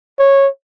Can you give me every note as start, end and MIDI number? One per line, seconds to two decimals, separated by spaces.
0.19 0.48 73